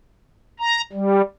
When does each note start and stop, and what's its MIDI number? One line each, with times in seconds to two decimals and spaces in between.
0.60 0.81 82
0.92 1.21 55